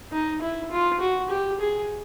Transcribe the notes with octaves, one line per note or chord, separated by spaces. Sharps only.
D#4
E4
F4
F#4
G4
G#4